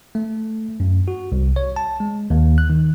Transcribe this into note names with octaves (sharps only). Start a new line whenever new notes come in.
A3
F#2
F#4
C2
C#5
A5
G#3
D#2
F#6
D#3